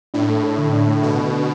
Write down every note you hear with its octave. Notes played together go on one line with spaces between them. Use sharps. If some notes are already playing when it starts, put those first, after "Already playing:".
A2 D4
A3
A4
D3
D4
A3
B2 A4
D3
D4